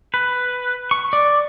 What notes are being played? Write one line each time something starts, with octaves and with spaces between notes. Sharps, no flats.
B4
C#6
D5